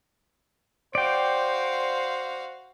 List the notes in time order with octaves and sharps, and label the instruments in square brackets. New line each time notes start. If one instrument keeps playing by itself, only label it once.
[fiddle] F#4 F5 [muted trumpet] C5 [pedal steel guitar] D5 G5